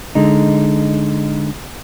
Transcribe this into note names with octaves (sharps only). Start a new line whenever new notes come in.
D3 G#3 D#4